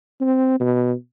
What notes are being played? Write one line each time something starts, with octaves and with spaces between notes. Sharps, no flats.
C4
B2